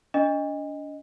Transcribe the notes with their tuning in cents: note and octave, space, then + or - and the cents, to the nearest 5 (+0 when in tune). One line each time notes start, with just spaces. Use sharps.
D4 -35 D#5 +0